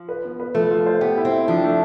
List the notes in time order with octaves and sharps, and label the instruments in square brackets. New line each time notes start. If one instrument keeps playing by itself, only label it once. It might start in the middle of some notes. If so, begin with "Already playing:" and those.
Already playing: [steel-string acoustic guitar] F3
[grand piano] B4
B3
B4
[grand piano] F3 [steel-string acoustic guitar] A3
[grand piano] F4
C5
[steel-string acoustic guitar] B3 [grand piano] G4
[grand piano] E4
[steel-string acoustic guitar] C4
[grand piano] E4
[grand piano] F3 [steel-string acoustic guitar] D4
[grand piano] A3